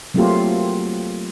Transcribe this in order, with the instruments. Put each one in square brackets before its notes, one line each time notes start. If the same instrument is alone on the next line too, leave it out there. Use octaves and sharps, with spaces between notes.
[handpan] F#3 A3 A#3 C4 F4 G4